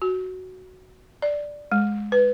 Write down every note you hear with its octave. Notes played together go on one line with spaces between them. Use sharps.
F#4
D5
G#3
B4